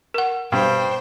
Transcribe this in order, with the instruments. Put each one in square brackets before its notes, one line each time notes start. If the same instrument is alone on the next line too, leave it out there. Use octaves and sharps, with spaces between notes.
[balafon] A#4 F#5
[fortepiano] G2 [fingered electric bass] B2 [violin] C5 G5